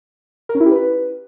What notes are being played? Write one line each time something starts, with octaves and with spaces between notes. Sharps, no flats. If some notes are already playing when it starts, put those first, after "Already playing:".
A#4
C#4
E4
G4
B4